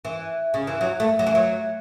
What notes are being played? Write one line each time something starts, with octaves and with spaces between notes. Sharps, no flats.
E3
C#3
E3
F#3
A3
F#3
E3
F#3